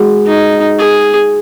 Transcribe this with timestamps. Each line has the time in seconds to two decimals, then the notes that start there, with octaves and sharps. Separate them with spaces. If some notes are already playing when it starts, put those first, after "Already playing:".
Already playing: G#3 F#4
0.26 D#4
0.79 G#4